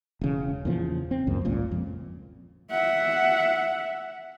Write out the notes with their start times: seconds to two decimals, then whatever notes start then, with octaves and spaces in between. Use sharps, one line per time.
0.21 E1 C#3
0.65 E2 A#2 C#3 F3
1.11 C4
1.27 C#2 F#2 A#2
1.45 G#1 C#2 A#2
1.71 F2
2.71 E5 F#5